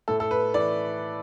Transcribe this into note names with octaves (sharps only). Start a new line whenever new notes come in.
A2 A4
A4
B4
E3 D5